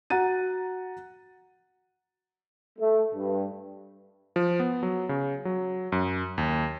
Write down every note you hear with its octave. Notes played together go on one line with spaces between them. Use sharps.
F#4 F#5 A#5 A6 D#7
A3
G2
F3
B3
F#3
C#3
F#3
F#2
D#2